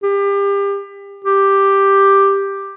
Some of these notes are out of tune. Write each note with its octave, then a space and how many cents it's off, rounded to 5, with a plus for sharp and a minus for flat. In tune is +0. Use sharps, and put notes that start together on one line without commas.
G4 +30
G4 +5